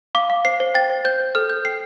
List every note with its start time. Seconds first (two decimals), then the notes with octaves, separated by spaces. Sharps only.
0.15 F5 D6
0.30 F5
0.45 C5 C7
0.60 C5
0.75 G5 A6
0.90 C5
1.05 C5 G6
1.20 C5
1.35 A4 F6
1.50 A4 G6
1.65 G5 C7